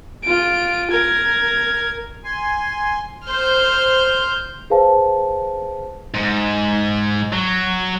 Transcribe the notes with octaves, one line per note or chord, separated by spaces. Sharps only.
F4 D7
A#4 G#6
G#5 C6
C5 F6 G6
G#4 B4 C5 F5 A5
G#2
F#3